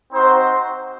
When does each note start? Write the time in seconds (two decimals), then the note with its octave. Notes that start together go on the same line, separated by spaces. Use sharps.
0.12 C4 D#4 F#4 C5